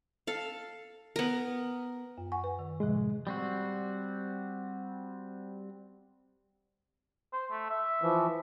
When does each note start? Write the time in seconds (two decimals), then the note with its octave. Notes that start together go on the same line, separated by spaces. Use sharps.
0.27 A4 F5
1.16 B3 A#4
2.18 F#2
2.32 F#5 G#5 C#6
2.44 B4
2.59 D#3
2.80 A2 C3 F3 G#3
3.27 G3 C4 F#4
7.33 C5
7.51 A3
7.69 E5
8.02 E3 F3